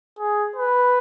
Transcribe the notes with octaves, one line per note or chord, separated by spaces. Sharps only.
G#4
B4